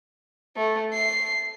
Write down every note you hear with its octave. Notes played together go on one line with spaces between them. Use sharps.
A3
C7